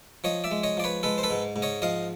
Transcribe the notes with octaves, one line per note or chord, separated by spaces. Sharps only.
F3 C#5 D#5
D5 E5
G#3
C#5 D#5
F3 D5
B4 C#5
G#3 A4 B4
C5
A4 B4
G#2
G#2
C#5 D#5
F3 D#5 F5